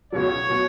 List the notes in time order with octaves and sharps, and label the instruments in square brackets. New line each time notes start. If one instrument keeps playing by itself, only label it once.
[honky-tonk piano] C#2 B2 F#3 [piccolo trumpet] C#5
[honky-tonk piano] B2 F#3